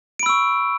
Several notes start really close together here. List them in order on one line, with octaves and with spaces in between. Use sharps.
D7 B5 E6 C#6